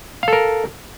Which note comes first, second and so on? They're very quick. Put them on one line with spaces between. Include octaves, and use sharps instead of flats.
F5 A4 A#4